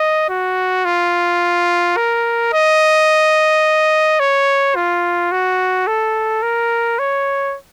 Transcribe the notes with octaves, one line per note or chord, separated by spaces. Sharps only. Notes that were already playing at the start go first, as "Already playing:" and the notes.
Already playing: D#5
F#4
F4
A#4
D#5
C#5
F4
F#4
A4
A#4
C#5